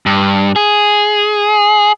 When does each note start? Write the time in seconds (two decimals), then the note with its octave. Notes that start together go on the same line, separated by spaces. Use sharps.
0.06 G2
0.56 G#4